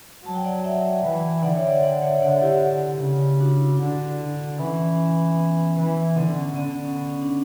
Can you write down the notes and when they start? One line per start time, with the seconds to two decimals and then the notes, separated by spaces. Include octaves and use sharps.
0.25 F#3 A5
0.35 G5
0.45 D5 F#5
0.64 E5 G5
1.04 E3
1.43 D3 D5 F#5
1.56 C#5 E5
1.70 D5 F#5
1.83 D5 F#5
2.02 C#5 E5
2.22 D3 D5 F#5
2.42 E4 G4
3.01 C#3
3.40 D4 F#4
3.60 E4
3.67 D4
3.76 D3 E4
4.59 E3 C#4
5.37 B3
5.78 E3
6.16 D3 B3
6.36 C#4
6.55 D3 B3
6.85 C#4
6.95 B3
7.09 C#4
7.22 D4